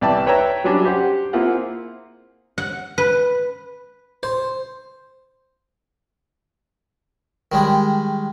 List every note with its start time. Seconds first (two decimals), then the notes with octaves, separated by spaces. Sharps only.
0.01 C2 E3 D5 E5 G5 A5
0.26 B4 C#5 E5 G5 A#5
0.64 F#3 G3 C#4 D4
0.85 G4 C5 F#5
1.33 A#3 C4 E4 F4 G#4 F#5
2.58 F#5
2.98 B4
4.23 C5
7.52 D#3 G3 G#3